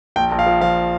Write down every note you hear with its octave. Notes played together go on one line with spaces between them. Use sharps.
A#1 G5
A#1
F5
F3
F3 F5